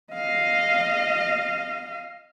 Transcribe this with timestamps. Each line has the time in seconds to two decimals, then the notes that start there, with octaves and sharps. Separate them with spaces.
0.13 D#5 F5